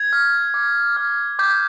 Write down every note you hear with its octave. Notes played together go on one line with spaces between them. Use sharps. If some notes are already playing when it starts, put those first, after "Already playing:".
Already playing: G#6
F6
D6
F6
D6 G6